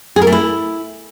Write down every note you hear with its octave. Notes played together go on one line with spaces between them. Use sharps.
G#4
A#4
A3
E4